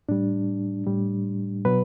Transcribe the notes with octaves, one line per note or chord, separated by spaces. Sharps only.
A2 G3 D4
A2 G3
B2 F#3 B4